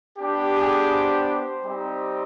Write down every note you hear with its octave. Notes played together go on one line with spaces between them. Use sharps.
B3 D4 G4
G#4
C5
G3 C4 D#4 G4